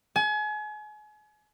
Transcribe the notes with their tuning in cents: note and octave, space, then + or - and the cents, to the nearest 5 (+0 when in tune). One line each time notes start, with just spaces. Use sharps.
G#5 +35